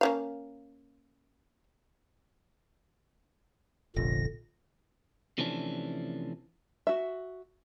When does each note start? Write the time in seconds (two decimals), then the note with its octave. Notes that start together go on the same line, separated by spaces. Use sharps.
0.01 A#3 C#4 F5
3.96 F1 A#1 A#2 D3 A#6
5.38 C3 E3 F3 A3 C#4 D4
6.87 F#4 E5